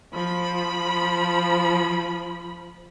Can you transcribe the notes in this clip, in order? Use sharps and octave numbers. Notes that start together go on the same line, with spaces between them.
F3 B5